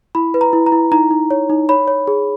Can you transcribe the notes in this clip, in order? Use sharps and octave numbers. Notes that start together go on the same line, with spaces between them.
E4 B5
B4
A#5
E4
A#5
E4
D#4 A#5
D#4
C#5
D#4
C#5 B5
C#5
G#4